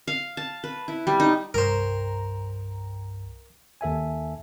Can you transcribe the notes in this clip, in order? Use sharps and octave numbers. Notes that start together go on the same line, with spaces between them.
F5
A5
B4
E4
G3
D#4
C2 G2 A#4 C5 A#5
D#2 A4 E5 G#5